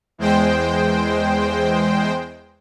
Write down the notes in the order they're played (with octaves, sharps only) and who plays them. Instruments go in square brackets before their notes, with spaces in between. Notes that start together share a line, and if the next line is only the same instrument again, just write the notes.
[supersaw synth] E2 G#3 C5 G5